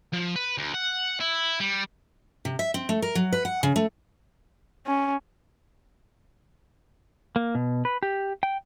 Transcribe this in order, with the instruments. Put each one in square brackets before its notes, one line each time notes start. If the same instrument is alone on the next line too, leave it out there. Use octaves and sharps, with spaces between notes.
[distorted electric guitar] F3
B4
D2
F#5
E4
G3
[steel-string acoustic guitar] C3
E5
C4
A3
A#4
F#3
B4
F#5
C#3
A3
[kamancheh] C#4
[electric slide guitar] A#3
B2
B4
G4
G5